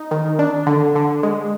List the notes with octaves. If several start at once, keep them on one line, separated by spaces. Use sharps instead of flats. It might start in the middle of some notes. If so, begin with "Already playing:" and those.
Already playing: D#4
D#3
D4
D3
D3
G#3